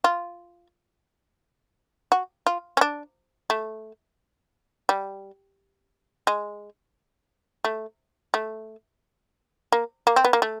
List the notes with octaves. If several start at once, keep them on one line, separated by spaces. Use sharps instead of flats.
F4
F#4
F4
C#4
D4
A3
G3
G#3
A3
A3
A#3
A#3
C4
B3
A#3
A3